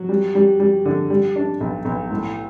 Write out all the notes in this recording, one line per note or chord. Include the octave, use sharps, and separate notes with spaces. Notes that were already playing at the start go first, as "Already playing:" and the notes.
Already playing: F#3
G3
G3
G3
D3
G3
D4
B1
B1
A2